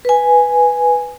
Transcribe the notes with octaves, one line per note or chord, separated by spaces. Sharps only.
B4 G#5